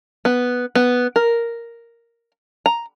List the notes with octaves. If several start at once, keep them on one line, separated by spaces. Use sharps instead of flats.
B3
B3
A#4
A#5